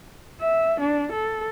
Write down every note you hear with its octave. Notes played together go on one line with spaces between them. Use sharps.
E5
D4
A4